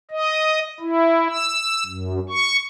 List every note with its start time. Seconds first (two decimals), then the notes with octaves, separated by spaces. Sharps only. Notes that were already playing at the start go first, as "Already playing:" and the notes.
0.11 D#5
0.80 E4
1.30 E6
1.86 F#2
2.29 C#6